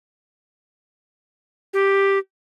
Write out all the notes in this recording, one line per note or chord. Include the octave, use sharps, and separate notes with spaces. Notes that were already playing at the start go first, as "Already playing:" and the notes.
G4